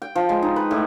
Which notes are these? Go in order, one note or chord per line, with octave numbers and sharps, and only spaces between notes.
G5
F3
G#3
D#4
B4
A2